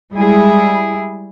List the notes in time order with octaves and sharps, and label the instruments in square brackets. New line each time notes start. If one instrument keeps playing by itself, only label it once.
[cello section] G3 G#3 E4 G#4